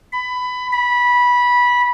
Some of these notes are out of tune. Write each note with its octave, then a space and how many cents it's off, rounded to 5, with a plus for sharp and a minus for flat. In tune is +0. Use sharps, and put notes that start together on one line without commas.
B5 +20
B5 -15